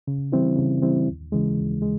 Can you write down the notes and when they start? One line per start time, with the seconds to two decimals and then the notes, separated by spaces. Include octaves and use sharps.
0.07 C#3
0.32 E3 G3 C4 E4
0.57 C#3
0.82 E3 G3 C4 E4
1.07 D#2
1.32 C#3 E3 G#3
1.57 D#2
1.82 G#3